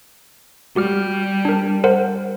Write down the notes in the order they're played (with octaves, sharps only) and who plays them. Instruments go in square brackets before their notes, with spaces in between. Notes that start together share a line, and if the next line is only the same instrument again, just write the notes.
[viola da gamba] G3 [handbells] F#4 G4 F6
[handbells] D4 A#4
A#4 C5 F#5